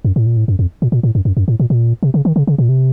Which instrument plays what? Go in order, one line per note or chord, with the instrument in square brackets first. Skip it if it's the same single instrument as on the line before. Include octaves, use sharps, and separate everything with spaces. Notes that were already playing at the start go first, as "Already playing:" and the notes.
[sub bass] F#2
A2
A#2
A2
F#2
F2
A#2
A#2
A2
F#2
F#2
F#2
A2
A#2
A#2
C3
C#3
D#3
C#3
C#3
A#2
C3